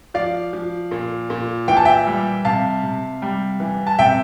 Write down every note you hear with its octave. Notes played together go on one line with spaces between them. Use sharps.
F3 D5 F5
F3
A#2
A#2
E3 G5
A5
E5 G5
G3
C3 F5 A5
C3
G3
E3
A5
C3 E5 G5